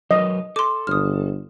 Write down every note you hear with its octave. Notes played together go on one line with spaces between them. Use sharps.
F#3 A#4 B4 D#5
A4 C6 D6
G1 D#6 F6